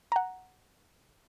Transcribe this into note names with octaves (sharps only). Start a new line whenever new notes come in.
F#5 A#5